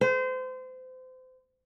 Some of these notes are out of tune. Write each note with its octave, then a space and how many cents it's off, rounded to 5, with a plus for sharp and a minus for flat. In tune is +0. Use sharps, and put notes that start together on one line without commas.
C5 -30